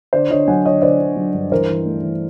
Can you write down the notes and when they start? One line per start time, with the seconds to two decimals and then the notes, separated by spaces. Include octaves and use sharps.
0.13 D3 C5 D5
0.30 D3 C#5 D#5
0.48 F#3 F#5 G#5
0.65 D3 C#5 D#5
0.82 D3 C5 D5
0.99 D3
1.16 F#3
1.34 G2
1.52 E3 A#4 C5
1.69 E3
1.85 A3
2.03 E3